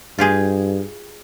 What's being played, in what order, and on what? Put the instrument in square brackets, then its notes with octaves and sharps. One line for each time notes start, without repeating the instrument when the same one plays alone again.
[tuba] G2 [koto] F4 G4 G#4